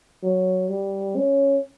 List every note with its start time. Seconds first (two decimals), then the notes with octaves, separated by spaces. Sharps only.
0.23 F#3
0.69 G3
1.16 C#4